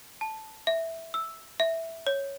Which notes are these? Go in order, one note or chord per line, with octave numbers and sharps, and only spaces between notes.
A5
E5
E6
E5
C#5